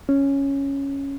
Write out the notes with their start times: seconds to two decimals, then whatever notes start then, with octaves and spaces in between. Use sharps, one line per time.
0.09 C#4